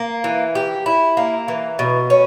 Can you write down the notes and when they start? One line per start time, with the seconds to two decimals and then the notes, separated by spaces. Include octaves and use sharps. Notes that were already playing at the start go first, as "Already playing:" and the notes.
Already playing: A#3
0.24 E3
0.55 G4
0.86 E4
1.17 A#3
1.48 E3
1.79 B2
2.10 C#4